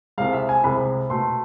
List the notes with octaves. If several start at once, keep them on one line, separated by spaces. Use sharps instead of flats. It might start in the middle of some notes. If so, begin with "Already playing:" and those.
C2 C3 G#3 F5
E5
G#5
C2 C3 G#3 B5
B2 A3 C6